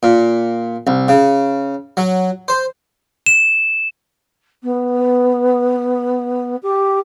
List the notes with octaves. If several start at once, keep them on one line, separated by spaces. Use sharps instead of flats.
A#2
C2
C#3
F#3
C5
E7
B3
G4